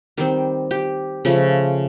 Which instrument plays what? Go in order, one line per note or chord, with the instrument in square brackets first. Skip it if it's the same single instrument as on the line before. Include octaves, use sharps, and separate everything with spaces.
[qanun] D#3 G3 C4
G4
C#3 F3 A3